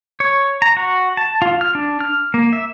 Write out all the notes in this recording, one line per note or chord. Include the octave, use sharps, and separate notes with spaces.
C#5
A#5
F#4
A5
F4
F6
D4
F6
A#3
E5